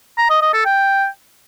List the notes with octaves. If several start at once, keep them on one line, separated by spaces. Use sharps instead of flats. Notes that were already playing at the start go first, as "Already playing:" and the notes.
A#5
D#5
D#5
A4
G5